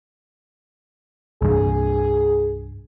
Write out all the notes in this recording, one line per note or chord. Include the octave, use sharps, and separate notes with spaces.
C2 G2 G#4